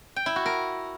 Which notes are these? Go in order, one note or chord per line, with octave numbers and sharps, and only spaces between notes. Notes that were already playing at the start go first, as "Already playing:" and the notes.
G5
E4
F#4
A#4